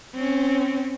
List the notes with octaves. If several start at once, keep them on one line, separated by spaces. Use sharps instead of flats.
C4 C#4